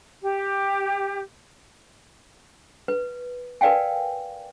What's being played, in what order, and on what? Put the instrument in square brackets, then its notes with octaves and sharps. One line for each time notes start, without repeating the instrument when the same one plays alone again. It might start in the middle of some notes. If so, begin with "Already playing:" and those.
[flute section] G4
[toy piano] B4
A#4 B4 D5 F5 G5 G#5